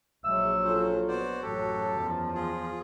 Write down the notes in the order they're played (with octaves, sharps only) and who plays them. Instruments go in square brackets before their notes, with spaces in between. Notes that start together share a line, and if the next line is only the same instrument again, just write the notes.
[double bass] A#1 F#3 [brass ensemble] G#3 C5 E5 [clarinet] E6
[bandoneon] C#4 C5 [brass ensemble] F4 A4
[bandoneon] B3 C5 D5 [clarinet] F#4
[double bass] A1 F#3 [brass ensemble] F#2 A5 [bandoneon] G4 A4
[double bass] E2 F3
[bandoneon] F4 G#4